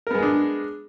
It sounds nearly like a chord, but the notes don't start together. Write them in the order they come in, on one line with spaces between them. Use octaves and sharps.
A#4 B3 G#3 G#4 D4